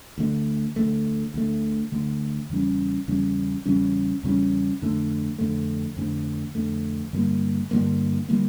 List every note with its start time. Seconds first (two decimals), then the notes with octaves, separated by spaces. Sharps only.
0.18 D2 D3 A3
0.76 D2 D3 A3
1.34 D2 D3 A3
1.92 D2 D3 A3
2.49 E2 C#3 G3 C#4
3.08 E2 C#3 G3 C#4
3.66 E2 C#3 G3 C#4
4.23 E2 C#3 G3 C#4
4.82 F2 D3 A3
5.39 F2 D3 A3
5.96 F2 D3 A3
6.55 F2 D3 A3
7.13 G2 D3 G3 A#3
7.71 G2 D3 G3 A#3
8.29 D3 G3 A#3